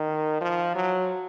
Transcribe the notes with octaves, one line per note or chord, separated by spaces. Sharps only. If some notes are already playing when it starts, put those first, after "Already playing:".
Already playing: D#3
F3
F#3